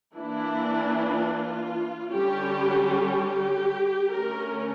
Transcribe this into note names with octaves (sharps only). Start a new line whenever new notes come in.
E3 A#3 D4 E4
F4
D3 G3 C#4 G4
G4
D3 A3 C#4 A#4